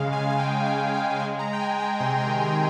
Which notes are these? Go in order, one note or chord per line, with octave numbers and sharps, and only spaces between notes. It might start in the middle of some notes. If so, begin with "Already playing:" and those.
Already playing: C#3 G#3 F5
C#3 G#5
G#5
G#3 G5
C#3 F5
G#3 G5
G#3 G#5
A#5
G#3
G5
G#5
G#3
A#5
C3 C6
A#5
D#3
G#5
C3